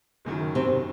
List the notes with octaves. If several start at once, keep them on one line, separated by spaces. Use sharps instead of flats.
F#1 F#2 D#3
C3